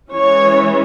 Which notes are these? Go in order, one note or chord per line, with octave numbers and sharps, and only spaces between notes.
E3 G#3 C#4 C#5